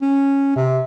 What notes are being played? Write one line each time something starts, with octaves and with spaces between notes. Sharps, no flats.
C#4
C3